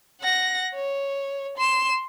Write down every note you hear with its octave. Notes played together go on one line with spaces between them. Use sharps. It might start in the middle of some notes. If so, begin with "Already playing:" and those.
F#5 A#6
C#5
C6 E7